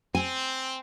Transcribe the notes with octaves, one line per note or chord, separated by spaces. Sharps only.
C4 G#5